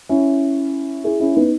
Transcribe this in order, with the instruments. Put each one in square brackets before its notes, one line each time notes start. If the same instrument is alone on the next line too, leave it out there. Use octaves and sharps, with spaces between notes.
[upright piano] C#4 E4
E4 G#4
C#4 E4
B3 D#4